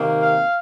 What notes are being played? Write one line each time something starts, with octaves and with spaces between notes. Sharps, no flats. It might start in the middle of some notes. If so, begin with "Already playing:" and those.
Already playing: C3 D#3 A#3
F5